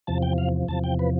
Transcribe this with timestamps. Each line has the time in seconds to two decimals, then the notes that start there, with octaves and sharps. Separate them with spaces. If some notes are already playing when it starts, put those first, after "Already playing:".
0.07 E2 C3 F3 A5
0.22 G5
0.38 F5
0.68 E2 C3 F3 A5
0.84 G5
0.99 B4